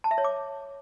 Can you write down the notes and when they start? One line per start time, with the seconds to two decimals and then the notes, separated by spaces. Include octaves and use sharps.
0.04 A5
0.11 E5
0.18 C#5
0.24 D6